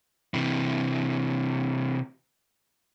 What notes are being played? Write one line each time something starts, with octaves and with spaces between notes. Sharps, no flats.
C3 E3